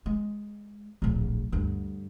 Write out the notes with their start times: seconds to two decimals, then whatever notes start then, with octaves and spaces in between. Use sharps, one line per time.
0.06 G#3
1.02 D1 A#1
1.52 D2 G2